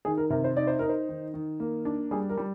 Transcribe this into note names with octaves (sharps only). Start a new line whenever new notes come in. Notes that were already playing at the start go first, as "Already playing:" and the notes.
D#3 G#4
A#4
C3 A#4
C5
D#4 D5
C5
D#4 A#4
C5
D#3
D#3
A#3
D4
G3 G#4
A#4
G3